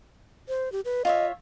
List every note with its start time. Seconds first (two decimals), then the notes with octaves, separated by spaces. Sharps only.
0.48 C5
0.72 G4
0.85 B4
1.05 F4 C#5 D#5 E5